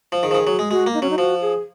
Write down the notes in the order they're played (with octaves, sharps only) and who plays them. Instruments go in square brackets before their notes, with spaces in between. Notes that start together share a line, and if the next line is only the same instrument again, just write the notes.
[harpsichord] F3
[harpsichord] D#3 [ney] G#4
[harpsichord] F3
D#3
F#3
G#3
[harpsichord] G#3 [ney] F#4
[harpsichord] A#3
[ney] D#4
[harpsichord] F#3 [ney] C#4
[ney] D#4
[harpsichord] F3 [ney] F#4
[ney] G#4